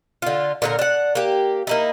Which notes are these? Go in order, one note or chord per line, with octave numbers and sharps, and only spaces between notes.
D3 F4
A#2 D3 A#4
D4 F#5
A#3 G4
A#3 D#4 E4